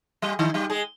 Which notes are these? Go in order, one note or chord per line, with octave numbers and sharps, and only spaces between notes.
G3 G4
D#3 D#4
G3 G4
G#3 G#4